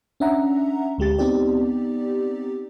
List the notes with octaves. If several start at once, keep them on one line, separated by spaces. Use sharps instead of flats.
C#4 D4 E5 F#5 A#5
D2 G#3 G4 A6
B3 C4 D#4 G4 D5